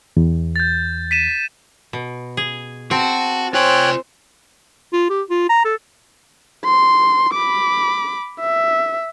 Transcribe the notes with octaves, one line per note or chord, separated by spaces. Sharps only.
E2
G6 A6
B6 D#7 E7
B2
G#4
C4 F#4 A5
F4 C5 C#5 G5 G#5 F#6
F4
G4
F4
A#5
A4
C6
B5 D6
E5